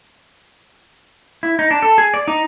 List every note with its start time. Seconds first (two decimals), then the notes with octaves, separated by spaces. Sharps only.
1.43 E4
1.59 D#4
1.71 D4
1.82 A4
1.98 G#4
2.14 D5
2.28 D#4